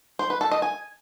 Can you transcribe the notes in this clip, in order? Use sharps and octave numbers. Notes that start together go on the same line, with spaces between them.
C5
B4
A4
D#5
G#5